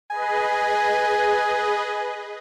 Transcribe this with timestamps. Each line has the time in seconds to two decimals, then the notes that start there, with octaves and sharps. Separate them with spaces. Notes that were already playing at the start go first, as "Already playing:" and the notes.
0.10 G#4 B4 D#5 G#5